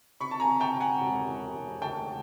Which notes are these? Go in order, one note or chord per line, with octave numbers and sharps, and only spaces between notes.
C3 B5 C#6
A5
G#5 A#5
C3
G5 A5
C3
F#5 G#5
E1
E1
E1
D2 G5 A5